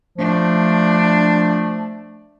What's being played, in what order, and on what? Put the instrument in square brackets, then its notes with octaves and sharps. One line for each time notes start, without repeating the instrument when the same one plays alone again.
[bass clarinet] F3 [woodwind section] A3 [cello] D4